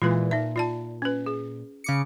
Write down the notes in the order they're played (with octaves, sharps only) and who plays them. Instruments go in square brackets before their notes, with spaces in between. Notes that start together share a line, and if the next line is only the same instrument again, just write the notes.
[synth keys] A#2 E3 G#3 [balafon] F4 B4
[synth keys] A#2 [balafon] D#4 E5
[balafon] F4 D5 A5
C#4 B4
G#4
[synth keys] C#3 D6 C#7